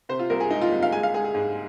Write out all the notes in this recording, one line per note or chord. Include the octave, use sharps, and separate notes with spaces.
C3 C5
F4
C2 A#4
G#4
G#3 D#4
F4
C2
F5
G#3 G#5
F5
G#3 G#4
G#4
G#2